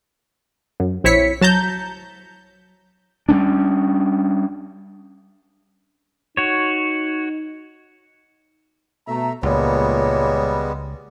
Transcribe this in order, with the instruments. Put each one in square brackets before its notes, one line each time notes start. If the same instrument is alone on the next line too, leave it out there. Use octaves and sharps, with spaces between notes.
[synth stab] F#2
A#1 C4 E4 C#5 B6 C#7
F#3 A5 A#5 G6
[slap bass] G3 B3 C#4 D4
[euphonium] D#4 [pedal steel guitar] F#4 C#5
[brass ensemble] B2 A3 A#5 [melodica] E5
[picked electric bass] C#2 [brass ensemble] A#2 A#3 C#5 [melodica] G3 G#3 B3